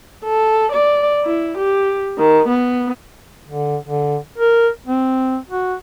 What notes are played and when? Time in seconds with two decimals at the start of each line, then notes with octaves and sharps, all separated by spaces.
0.25 A4
0.72 D5
1.25 E4
1.58 G4
2.18 D#3
2.49 B3
3.49 D3
3.85 D3
4.38 A#4
4.87 C4
5.49 F#4